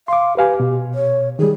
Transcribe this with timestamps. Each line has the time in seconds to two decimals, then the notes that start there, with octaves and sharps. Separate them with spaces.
0.08 F5 C6 D6
0.37 G4 B4 F5 G#5
0.60 B2
0.94 C#5
1.39 D#3 G3 G#4